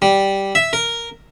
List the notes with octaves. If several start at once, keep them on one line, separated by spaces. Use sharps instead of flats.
G3
E5
A#4